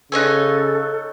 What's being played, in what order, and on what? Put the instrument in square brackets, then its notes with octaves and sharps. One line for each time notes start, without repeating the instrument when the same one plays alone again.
[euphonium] C#3 [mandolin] D#4 C#5 G#5 [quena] A4 [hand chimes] E6 F#6